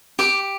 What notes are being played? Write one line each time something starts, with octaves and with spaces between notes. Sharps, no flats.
G4 D6